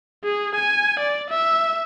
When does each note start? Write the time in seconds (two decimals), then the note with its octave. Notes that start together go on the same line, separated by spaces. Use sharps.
0.24 G#4
0.55 G#5
0.99 D5
1.30 E5